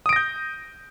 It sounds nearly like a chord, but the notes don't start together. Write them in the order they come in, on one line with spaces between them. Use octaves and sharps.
D#6 D7 A#6 G6